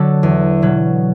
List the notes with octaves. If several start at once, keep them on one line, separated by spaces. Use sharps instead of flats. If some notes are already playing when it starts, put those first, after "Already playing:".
Already playing: D3 F#3 F#4 A4
E2
B2 F#3